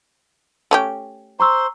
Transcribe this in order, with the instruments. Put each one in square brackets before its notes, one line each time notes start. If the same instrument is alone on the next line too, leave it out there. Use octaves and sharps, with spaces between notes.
[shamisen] A3 C#4 G4
[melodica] C5 C6 [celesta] A#5 C#6 E6